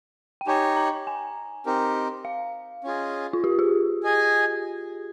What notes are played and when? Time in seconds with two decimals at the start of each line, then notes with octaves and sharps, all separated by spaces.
0.41 G5
0.47 D#4 G4 C#5 G#5
0.77 A#5
1.07 G#5
1.66 C4 D#4 G4 A#4
2.25 F5
2.84 C#4 F4 G#4 D#5
3.33 F4
3.44 G4
3.59 G#4
4.03 G#4 D#5 G#5